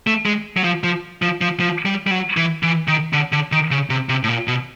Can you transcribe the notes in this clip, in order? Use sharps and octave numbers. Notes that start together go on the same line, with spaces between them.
A3
G#3
F#3
F3
F3
F3
F3
F3
G3
G3
F#3
E3
E3
D#3
D3
D3
D#3
C#3
C3
C3
A2
A#2
B2